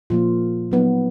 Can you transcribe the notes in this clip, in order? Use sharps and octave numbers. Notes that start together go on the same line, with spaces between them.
A#2 F3 A#3 F4
F#3 B3 D#4